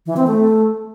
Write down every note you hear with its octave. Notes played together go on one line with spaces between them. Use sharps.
E3
C4
A3